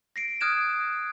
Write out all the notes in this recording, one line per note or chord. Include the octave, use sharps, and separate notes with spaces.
A#6 C7 D7
D#6 F6 F#6 G#6 D7 E7